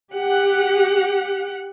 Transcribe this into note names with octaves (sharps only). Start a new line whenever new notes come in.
G4 F#5